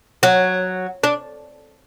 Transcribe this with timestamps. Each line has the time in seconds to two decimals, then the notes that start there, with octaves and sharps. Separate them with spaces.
0.23 F#3
1.04 D4